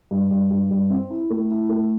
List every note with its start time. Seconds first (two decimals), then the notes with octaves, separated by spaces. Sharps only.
0.11 G2
0.31 G2
0.51 G2
0.71 G2
0.90 C4
1.10 E4
1.30 A3
1.51 E4
1.69 A3